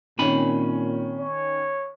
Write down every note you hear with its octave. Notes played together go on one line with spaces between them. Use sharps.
A#2 D#3 C4 C#4 G#5 B5
C#5